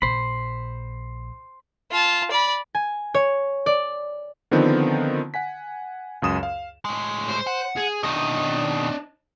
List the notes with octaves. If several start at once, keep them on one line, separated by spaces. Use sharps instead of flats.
A#1 C5 B5
F4 A5
D5 B5
G#5
C#5
D5
D3 D#3 F3 B3 C4 D#4
F#5 G#5 B6
C#2 F#2 D#6 E7
F5
A2 G#3
C5
F#5
G#4
B2 D#3 D4 D#5